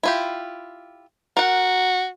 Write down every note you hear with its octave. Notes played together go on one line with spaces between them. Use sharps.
E4 F4 G4
F#4 A#4 F#5